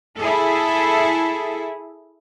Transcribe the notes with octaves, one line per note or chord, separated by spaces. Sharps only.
E4 G#4 A4